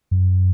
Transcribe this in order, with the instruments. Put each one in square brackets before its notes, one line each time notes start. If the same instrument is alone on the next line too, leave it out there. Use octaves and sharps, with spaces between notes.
[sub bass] F#2